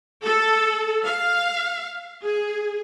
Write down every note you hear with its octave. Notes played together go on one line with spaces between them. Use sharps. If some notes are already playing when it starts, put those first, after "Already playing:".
A4
F5
G#4